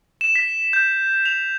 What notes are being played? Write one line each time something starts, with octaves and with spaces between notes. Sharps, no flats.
E7
B6
G6
F7